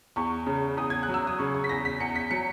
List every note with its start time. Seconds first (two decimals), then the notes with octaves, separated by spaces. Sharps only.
0.16 E2 C#6
0.47 C#3
0.77 E2 D#6
0.90 G#6
1.03 F#6
1.08 F#3
1.14 E6
1.27 D#6
1.39 C#3 C#6
1.54 C#6
1.64 B6
1.69 E2 A#6
1.85 B6
2.00 E2 C#7
2.16 B6
2.31 F#3 C#7